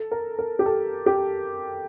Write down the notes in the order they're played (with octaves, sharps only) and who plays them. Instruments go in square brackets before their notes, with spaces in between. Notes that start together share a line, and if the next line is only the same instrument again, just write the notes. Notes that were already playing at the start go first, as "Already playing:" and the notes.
Already playing: [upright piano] A4
A#4
A#4
G4
A4
G4